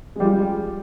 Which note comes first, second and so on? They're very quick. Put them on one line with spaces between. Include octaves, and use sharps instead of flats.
G#3 G3 F4